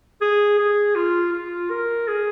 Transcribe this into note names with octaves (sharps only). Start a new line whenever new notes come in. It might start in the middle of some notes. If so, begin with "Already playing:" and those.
G#4
G#4
F4
F4
A#4
G#4